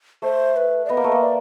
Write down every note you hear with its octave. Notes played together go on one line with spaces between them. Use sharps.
A3 C5
B4
D5
B3 D#5
A#3
A3
A#3
D5